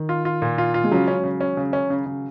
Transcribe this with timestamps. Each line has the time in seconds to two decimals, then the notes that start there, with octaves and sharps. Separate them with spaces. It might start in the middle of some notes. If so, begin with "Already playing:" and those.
Already playing: D#3
0.09 F4
0.25 F4
0.42 A#2
0.58 F4
0.74 F4
0.84 G#3
0.91 C#3 F#3
1.08 C#4
1.24 C#3
1.41 C#4
1.57 C#3
1.73 C#4
1.90 C#3
2.06 C#3